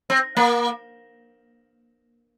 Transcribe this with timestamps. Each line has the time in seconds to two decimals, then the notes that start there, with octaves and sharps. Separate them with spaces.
0.10 C4
0.37 A#3